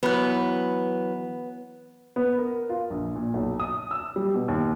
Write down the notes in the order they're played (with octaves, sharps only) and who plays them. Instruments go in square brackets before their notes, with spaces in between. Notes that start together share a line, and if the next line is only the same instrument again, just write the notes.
[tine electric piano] E3 F#3 [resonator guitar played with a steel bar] B3 [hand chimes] B4 B5 F#6
[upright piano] B3
A#4
F4
A#1
A#2
B1
D#6
E6
G3
B2
D#2